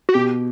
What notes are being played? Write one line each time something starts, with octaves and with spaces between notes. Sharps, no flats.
F#4
B2 G4